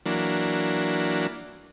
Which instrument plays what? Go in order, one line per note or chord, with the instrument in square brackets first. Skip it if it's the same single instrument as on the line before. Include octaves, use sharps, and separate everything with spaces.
[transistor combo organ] E3 F#3 A#3 D4